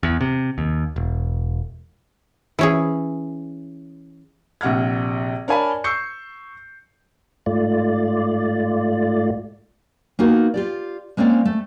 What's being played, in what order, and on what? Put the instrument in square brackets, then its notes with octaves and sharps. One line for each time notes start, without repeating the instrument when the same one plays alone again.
[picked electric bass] E2
C3
D#2
E1
[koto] E3 C#4 G#4
[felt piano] A#1 C3 F#5 F6 G#6
D4 A#4 C#5 G#5 A5 B5
C#6 E6 G6 C7 C#7
[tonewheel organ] G#2 A3 F4 D5
[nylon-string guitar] A#3 B3 D#4 F#4 A#4
F4 G4 D5
G#3 A#3 C4 C#4 D5
A3